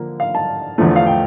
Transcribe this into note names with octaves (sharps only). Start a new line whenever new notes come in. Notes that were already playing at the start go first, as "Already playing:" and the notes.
Already playing: D3 F3 A#3
F5
A5
E2 D3 F3 A3
F5
G5